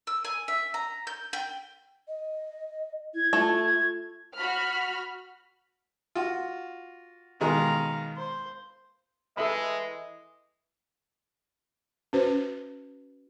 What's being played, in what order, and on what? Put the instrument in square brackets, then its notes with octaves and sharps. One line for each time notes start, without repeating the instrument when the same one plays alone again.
[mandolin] E6
G#5
E5
A#5
G6
G5
[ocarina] D#5
[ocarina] E4 [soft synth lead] G#6
[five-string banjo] A3 [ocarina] F4
[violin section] F#4 B5 F6
[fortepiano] F4 F#4
[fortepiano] B2 D#3 G#3 [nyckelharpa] F5 A#5
[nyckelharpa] C5
[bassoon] E3 [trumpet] G#3 [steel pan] A4 E5 B5 [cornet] D#5
[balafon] C#4 F#4 B4 C5